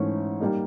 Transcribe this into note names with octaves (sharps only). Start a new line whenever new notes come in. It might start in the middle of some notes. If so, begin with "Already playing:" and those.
Already playing: G#2 E3 A3 C#4
G3 A#3 D#4